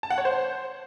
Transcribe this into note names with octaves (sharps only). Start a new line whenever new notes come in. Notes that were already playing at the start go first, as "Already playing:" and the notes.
A5
F#5
C#5
C5